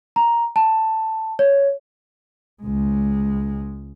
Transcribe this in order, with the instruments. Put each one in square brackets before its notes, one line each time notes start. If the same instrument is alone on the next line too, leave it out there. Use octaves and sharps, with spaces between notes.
[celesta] A#5
A5
C#5
[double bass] C#2 G#3